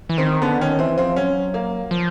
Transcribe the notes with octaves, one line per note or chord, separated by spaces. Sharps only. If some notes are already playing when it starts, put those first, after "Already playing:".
E3
D#3 C4
D3 B3
D#3 C#4
E3 C4
F3 C4
F#3 C#4
A#3
F3